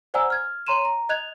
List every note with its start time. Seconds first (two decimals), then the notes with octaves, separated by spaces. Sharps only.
0.14 C5 D5 F#5 G#5 A#5 E6
0.30 F6 G#6
0.67 C#5 A#5 C6 D#7 E7
0.85 A#5
1.09 D#5 F#6 G#6 F7